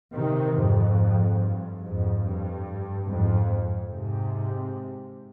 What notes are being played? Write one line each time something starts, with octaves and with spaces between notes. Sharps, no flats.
C3 D#3
F2 G#2
G2
F2 G#2
G2
F2 G#2
G#2 C3